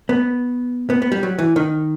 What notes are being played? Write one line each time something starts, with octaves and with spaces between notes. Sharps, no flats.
B3
B3
B3
G3
F#3
E3
D#3